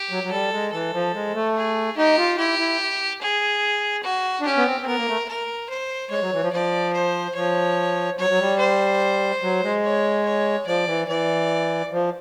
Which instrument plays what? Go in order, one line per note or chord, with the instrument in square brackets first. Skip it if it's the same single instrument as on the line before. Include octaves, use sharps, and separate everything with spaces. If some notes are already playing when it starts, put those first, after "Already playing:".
Already playing: [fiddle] G4
[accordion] F#3
F#3
[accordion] G3 [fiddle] A4
[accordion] G#3
[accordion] E3 [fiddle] A4
[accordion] F3
G#3
A3
[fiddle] G#4
[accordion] D#4 [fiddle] G4
[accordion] F4
[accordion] E4 [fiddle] G4
[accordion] E4
[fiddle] G#4
F#4
[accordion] D4
[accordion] C#4 [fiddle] G4
[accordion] B3
C4
C4
[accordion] B3 [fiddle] A#4
[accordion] A#3
A3
[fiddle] A#4
C5
[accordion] G#3 [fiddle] C#5
[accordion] F#3
E3
F3
[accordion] F3 [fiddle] D5
[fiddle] C5
[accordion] F3 [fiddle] C#5
[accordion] F#3 [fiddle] C#5
[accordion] F#3
G3
[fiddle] C5
[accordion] F#3
G#3
[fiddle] C#5
C#5
[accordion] F3 [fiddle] D5
[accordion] E3
[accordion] E3 [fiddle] D5
[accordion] F3